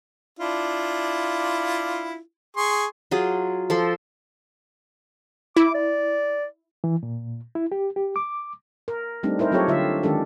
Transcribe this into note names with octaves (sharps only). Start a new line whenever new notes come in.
D4 E4 F4
G#4 C6 C#6
F#3 F4 G#4
F3 A4 C6
E4 D6
D5
E3
A#2
E4
G4
G4
D6
A#4
G3 A3 C4 D4 D#4
D#4 E4 A#4 C5
F#3 C4 F4 G4 A4 C#5
D3 F4 E5
D#3 G#3 C#4 D4 G4 A4